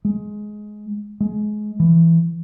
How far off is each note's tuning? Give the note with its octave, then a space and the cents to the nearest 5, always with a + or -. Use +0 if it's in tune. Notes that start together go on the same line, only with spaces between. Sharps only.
G#3 +15
G#3 +25
E3 +10